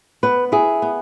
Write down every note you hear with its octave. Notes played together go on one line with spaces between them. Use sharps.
B3 B4
E4 G#4
B3